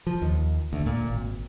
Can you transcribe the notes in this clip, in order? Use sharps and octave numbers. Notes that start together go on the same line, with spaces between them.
F3
D#2
D2
A#2
G#1